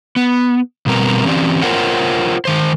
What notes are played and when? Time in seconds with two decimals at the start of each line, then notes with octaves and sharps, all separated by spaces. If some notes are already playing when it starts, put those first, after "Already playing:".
0.16 B3
0.86 B2 G3 C4 A#4 B4
1.25 E3 C4 C#4 G4 D5
1.62 F4 A#4 C5 C#5 F#5 G5
2.45 D#3 C5